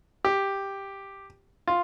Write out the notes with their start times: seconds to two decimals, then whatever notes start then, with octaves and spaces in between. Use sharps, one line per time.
0.25 G4
1.68 F4